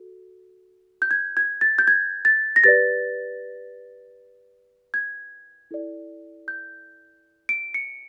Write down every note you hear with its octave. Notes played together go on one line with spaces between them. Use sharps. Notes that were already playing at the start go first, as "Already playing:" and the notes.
Already playing: F#4 A4
G6
G#6
G#6
A6
G6
G#6
A6
A#6
G4 B4 D5 A6
G#6
E4 A4 D5
G6
D7
C#7